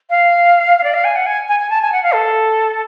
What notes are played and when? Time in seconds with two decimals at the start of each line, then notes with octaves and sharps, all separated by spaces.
0.10 F5
0.78 F5
0.84 D5
0.94 F5
1.04 G#5
1.16 F#5
1.26 G#5
1.49 G#5
1.60 G#5
1.70 A5
1.82 G#5
1.92 F#5
2.03 F5
2.14 A4